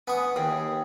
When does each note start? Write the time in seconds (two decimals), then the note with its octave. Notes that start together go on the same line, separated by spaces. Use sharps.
0.08 B3 G#5 C#6 D#6
0.36 D#2 G#4 G5 D#6